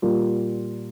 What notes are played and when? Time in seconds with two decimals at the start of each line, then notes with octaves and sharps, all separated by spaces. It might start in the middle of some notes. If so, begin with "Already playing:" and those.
0.02 A#2 G3 A#3 F4